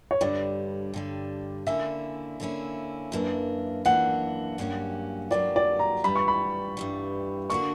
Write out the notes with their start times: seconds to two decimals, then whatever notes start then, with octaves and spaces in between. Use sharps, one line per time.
0.11 C#5
0.21 G2 D3 G3 D5
0.94 G2 D3 G3
1.67 D3 A#3 C#4 E4 E5
2.40 D3 A#3 C#4 E4
3.12 F#2 E3 A#3 D4
3.85 F#2 E3 A#3 D4 F#5
4.58 G2 F#3 A#3 C#4 G4
5.31 G2 F#3 A#3 C#4 G4 D5
5.56 D5
5.79 A#5
6.04 G2 E3 G3 B5
6.15 C#6
6.28 B5
6.77 G2 E3 G3
7.50 D3 A#3 D4 F#4 C#6